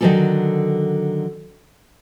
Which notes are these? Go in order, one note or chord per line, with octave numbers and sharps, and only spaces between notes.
D3 D#3 F#3 B3 G#4 A4